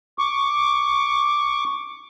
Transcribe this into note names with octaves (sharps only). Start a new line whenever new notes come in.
C#6 D6